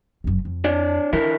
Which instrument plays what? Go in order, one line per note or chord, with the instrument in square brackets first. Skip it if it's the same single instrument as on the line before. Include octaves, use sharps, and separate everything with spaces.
[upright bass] F#1 F#2
F2
[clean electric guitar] D4 C#5 D5
[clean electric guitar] D3 E4 A#4 [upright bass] E3